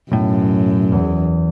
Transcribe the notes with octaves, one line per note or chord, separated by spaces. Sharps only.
B1 F#2 A2
E2